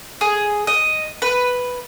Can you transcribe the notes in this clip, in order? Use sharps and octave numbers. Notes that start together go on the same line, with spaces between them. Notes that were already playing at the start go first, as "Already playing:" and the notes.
G#4
D#5
B4